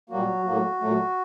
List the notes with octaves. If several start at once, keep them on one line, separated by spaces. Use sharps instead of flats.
A#2 F#3 G3 A#3 F#4
A2 F#3 A#3
A#2 F#3 A3